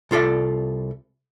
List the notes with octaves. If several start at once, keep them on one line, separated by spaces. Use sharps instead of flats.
C2 F4 A4 D5 E5